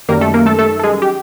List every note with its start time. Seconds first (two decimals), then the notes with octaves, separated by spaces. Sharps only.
0.09 F#2 D#3 G3 A#3 A#4
0.21 A3 A4
0.34 A#3 A#4
0.46 A3 A4
0.59 A3 A4
0.79 A4
0.83 G#3 G#4
1.02 G4